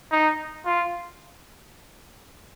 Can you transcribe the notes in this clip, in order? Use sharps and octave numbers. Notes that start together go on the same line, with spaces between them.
D#4
F4